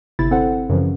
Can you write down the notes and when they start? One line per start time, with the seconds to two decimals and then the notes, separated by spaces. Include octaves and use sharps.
0.19 G1 C3 E4 A6
0.31 C4 A4 C5 F#5
0.69 F#2 C#3 E3 F3